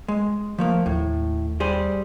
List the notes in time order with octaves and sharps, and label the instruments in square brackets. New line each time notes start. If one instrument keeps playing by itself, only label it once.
[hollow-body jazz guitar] G#3
F3 A3 A#3
[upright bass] D#2 A3 [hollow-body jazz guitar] A2
[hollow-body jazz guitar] G3 G#4 C5